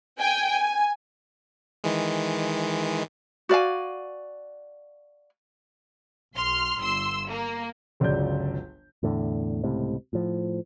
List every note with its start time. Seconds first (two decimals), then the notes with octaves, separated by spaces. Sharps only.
0.21 G5 G#5
0.51 G#5
1.84 D#3 E3 G#3
3.49 F#4 D5 F5 G#5
6.35 B1 C6 F6
6.79 G1 C6 E6
7.29 A#3
8.00 G1 C#2 F#3 D5 G6
9.03 E2 A2 D3
9.64 C#2 A2 C3
10.13 A2 F3